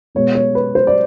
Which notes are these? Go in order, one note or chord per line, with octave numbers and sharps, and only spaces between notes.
B2 G#3 B3 C#5
C#5
B4
C5
D5